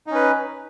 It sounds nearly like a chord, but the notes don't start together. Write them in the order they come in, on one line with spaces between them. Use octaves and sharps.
D#4 C#4 B4